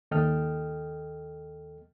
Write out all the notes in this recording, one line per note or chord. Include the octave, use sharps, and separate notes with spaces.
D#2 A4 D#5 G5 F6